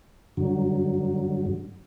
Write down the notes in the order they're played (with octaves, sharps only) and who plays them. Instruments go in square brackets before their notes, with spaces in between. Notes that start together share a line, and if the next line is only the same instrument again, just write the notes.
[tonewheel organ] G2 D3 F#3